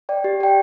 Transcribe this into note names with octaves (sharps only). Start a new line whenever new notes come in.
D5 G5
G4
D5 G5